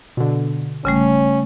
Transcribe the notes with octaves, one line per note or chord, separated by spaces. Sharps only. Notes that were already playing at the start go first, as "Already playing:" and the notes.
B2 D3
A1 C#3 G3 A3 C#4